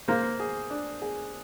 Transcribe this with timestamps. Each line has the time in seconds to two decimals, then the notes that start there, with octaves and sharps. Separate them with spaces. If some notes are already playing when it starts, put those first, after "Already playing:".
0.08 A#3 C5
0.40 G#4
0.70 D4
1.02 G#4